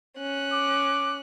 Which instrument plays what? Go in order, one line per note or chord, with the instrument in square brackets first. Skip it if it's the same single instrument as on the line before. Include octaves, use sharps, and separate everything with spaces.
[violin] C#4 F#6
[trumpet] D6